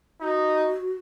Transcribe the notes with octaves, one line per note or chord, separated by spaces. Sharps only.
D#4 F#4